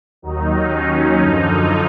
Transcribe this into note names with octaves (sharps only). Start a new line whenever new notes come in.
D#2 D#3 F#3 D#4
C#4
F#2 D3 F3 D#4